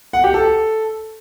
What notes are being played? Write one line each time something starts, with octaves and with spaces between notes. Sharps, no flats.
F#5
G4
A4